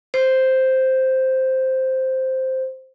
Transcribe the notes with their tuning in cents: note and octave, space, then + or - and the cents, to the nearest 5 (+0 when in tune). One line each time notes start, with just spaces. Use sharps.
C5 +0